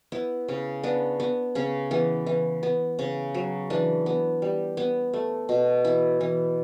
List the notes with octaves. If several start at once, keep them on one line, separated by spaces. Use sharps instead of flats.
B3 E4
C#3
B3 D4
B3
C#3 C#4
E3 B3
E3
B3
C#3
F#3
E3 D4
B3
G3
B3
A3
B2
E3 E4
E3